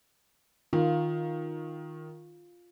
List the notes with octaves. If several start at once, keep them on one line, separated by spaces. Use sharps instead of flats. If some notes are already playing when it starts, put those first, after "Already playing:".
D#3 F4